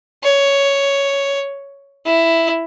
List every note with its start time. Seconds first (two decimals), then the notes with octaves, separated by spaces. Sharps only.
0.23 C#5
2.06 E4